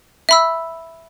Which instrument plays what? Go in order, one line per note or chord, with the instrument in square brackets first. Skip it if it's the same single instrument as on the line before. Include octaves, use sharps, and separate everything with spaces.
[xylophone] E5 B5 E6